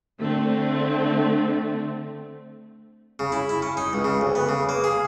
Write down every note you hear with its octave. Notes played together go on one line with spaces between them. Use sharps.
D3 A3 C4
C#3
E4
E4
C#4
D#4
C#2
C#3
D2
B3
C#3
A#3
G#4